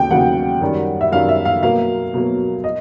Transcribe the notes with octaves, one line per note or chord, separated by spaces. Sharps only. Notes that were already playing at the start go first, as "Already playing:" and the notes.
Already playing: D#2 C#3 F#3 G5
D#2 C#3 F#3 F#5
F#2 D#3 G3
E5
F#2 D#3 G3 F5
E5
F5
B2 F#3 A#3 F5
B2 F#3 A#3
D#5